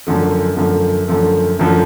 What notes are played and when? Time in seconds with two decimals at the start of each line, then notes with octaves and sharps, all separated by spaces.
0.07 F#2 D3 F3 A3
0.57 F#2 D3 F3 A3
1.08 F#2 D3 F3 A3
1.59 F#2 D3 F3 A3